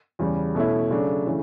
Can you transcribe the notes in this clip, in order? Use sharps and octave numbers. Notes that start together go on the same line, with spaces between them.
E2 C#3 G3
B2 A3 C#4 E4
C#3 F#3 A3 D4
C#3 E3 A3